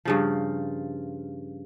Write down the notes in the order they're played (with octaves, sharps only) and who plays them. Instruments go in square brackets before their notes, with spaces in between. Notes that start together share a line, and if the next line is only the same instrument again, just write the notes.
[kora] G2 C#3 F3